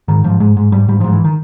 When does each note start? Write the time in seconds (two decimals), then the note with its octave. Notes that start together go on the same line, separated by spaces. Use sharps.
0.08 G#2 D#3
0.24 G#2 F3
0.40 G#2 G#3
0.57 G#2 G#3
0.72 G#2 G3
0.88 G#2 G3
1.00 F3
1.04 G#2
1.12 E3
1.24 D#3